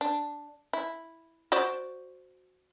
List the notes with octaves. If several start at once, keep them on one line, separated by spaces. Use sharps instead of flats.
D4
E4
F#4 C5 D5